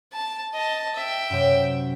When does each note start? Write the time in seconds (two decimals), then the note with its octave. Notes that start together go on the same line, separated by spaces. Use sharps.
0.13 A5
0.54 D#5 A5
0.95 E5 G5
1.30 F#2 C3